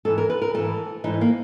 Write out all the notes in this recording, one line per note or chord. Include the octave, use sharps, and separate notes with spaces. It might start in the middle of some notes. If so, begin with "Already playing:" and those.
G#2 E3 A4
A#4
B4
A#4
G#2 E3 A4
G#2 E3 D#4
A#3